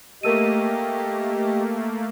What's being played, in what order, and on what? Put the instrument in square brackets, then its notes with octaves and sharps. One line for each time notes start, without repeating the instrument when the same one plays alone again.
[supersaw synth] A3 A#3 [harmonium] G4 D#5 [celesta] A#4 E6 D#7